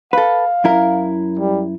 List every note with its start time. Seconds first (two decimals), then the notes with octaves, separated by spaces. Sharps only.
0.13 A4 B4 F5
0.64 F#2 E4 A#4
1.39 G3